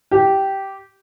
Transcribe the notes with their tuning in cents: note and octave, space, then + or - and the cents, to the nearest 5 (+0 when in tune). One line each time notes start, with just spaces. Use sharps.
G4 -10